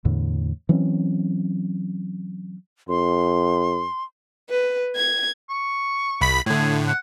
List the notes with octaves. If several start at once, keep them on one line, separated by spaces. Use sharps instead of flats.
E2 A2 D3
E3 F#3 C4 C#4
F2 C6
B4
G#6
C#6
C2 B5 B6
A2 D3 G#4
F#5